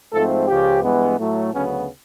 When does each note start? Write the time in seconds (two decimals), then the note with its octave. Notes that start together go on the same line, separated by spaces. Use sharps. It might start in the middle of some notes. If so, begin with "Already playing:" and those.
0.13 G#2 F3 A3 C4 A4
0.48 C#2 C#3 F3 G4
0.83 G2 E3 G#3 B3
1.18 A2 F#3 A3
1.53 D2 C#3 F#3 B3 C#4